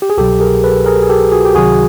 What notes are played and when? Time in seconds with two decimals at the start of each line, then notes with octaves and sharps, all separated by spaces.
0.02 G4
0.10 G#4
0.18 C2 B2 F#3 G4 A4
0.40 G#4 A#4
0.64 A4 B4
0.86 G#4 A#4
1.02 G#4
1.09 G4 A4
1.32 F#4 G#4
1.45 G4
1.55 C#2 C3 D#3 F#3 F#4 G#4